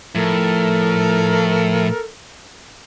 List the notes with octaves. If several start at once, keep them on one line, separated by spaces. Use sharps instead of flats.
A2 F3 A4 A#4